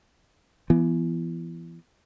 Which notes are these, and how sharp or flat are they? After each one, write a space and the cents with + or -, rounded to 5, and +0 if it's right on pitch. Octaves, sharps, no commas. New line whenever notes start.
E3 +30 B3 +0